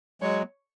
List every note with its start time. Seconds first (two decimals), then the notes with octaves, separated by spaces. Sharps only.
0.22 F#3 G#3 C#5